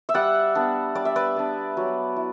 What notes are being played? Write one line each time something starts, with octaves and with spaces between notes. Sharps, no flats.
E5
G3 D5 F#5
B3 D4
G3 D5
E5
B4 D5
B3 D4
F#3
E4